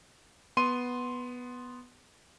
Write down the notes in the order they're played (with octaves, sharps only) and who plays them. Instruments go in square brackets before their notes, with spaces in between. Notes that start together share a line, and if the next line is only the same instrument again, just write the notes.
[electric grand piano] B3 C6 D#7